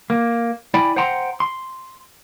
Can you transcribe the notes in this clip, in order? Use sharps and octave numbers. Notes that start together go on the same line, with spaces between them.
A#3
E4 D5 G5 G#5 B5
C5 F#5 G5 A#5 C6
C6